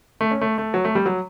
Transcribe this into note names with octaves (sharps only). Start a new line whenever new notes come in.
A3
C#4
A3
A3
F#3
A3
G3
F#3